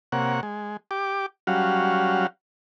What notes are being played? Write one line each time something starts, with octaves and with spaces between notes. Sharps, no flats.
C3 A#3 C#5 F#5
G#3
G4 D6
F#3 G3 C#4 F#4 F5